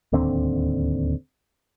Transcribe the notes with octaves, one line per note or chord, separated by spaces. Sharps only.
D1 D#2 D3 C4